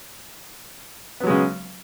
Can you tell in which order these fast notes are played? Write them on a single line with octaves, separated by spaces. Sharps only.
B3 F#3 G#3 C#3